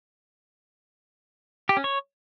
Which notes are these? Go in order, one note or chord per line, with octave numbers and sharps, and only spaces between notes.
G4
C#4
C#5